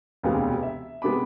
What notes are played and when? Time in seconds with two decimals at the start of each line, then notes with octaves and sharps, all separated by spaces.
0.23 E1 D2 C3 G#3 B3 F5
0.63 E5
1.02 C3 G#3 B3 B5 D6